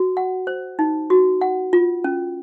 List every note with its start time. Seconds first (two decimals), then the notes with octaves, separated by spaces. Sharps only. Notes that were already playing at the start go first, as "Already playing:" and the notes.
Already playing: F#4
0.17 F#5
0.47 C5
0.79 D#4
1.10 F#4
1.41 F#5
1.73 F4
2.04 C#4